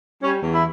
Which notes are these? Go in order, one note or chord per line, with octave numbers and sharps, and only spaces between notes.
G3 C#4
E2
E4